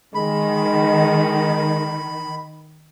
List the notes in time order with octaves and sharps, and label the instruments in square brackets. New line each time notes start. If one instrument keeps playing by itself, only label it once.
[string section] D#3 [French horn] G#3 [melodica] B5